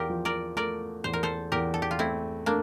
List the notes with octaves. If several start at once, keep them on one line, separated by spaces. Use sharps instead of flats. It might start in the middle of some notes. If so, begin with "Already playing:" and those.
Already playing: E2 F4 G4 A#4
F3
A#4 D5
A3 A#4 D5
E2 C5
A#4
A4 C5
E2 G4 A#4
A4
G4
F4
A3 C4 E4
A3 A#3 D4